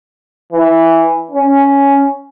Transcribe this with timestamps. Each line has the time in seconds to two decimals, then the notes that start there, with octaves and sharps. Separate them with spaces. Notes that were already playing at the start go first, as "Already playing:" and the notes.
0.53 E3
1.31 C#4